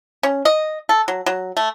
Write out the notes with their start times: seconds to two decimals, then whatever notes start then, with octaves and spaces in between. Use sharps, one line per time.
0.23 C#4
0.45 D#5
0.89 A4
1.08 F#3
1.26 F#3
1.57 A3